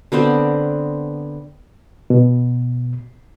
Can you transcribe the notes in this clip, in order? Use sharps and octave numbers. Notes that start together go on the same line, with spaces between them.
D3 B3 C4 C5
B2